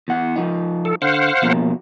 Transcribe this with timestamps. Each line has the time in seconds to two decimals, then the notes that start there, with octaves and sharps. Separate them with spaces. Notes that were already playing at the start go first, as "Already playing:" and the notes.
0.08 E2 F#5
0.36 F3 D#4
0.85 A4
1.02 D3 C5 F5 F#5
1.42 B2 F3 A#3